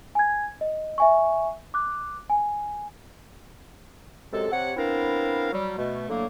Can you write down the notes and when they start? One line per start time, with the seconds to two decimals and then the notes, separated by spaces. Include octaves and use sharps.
0.15 G#5 G#6
0.61 D#5
0.98 E5 G#5 C#6
1.74 D6 F#6
2.30 G#5
4.32 F#2 C3 G#3 A4
4.51 C3 C#5 F#5
4.76 B3 C4 D4 E4 A#4 F5
5.52 F#3 G3
5.77 B2 A3
6.09 A2 D3 F#3 A3 A#3